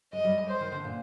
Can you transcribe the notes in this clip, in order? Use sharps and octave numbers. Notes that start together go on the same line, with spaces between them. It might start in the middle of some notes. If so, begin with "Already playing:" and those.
G#3 D#5
G3
C5
D#3
D3
A#2